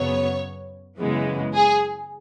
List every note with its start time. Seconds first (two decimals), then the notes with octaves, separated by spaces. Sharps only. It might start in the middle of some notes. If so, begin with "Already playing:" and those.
Already playing: F#2 C#3 F#3 B3 C#5
0.99 F#2 C#3 E3 G#3 B3
1.55 G#4